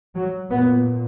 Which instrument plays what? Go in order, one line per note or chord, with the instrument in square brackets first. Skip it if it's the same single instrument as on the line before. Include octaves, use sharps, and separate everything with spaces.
[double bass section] F#3
A#2 B3